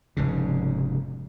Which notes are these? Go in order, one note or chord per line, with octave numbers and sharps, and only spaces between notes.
F1 G#2 C#3